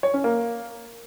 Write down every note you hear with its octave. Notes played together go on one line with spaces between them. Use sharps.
C#5
C#4
A#3